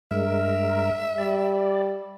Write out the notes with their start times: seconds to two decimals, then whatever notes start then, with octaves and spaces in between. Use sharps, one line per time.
0.11 G2 G#3 A#4 E5
1.18 G3 D5